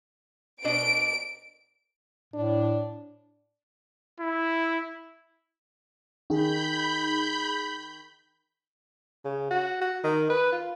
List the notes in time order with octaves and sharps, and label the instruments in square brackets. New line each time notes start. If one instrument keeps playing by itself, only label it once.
[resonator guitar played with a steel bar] B2 D4 D#5 [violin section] D7
[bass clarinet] A2 [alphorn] D4
[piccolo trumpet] E4
[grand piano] D#3 [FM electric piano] D#4 G#4 [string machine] B5 G6
[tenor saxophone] C#3
F#4
F#4
D#3
B4
F4